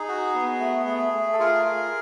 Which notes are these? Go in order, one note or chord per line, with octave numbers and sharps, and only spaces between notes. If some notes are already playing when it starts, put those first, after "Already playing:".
Already playing: D#4 G#4
F#4
B3
A3
A3
A3
A4
F4 G#4 A#4
F4